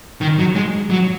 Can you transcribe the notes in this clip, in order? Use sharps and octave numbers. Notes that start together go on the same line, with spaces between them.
D#3
F#3
G#3
F#3